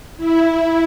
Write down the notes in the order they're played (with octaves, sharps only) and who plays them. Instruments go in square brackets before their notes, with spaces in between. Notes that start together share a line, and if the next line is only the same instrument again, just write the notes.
[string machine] E4